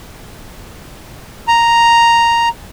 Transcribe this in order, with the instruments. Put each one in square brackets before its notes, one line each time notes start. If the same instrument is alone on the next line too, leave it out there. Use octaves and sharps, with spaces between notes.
[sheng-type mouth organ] A#5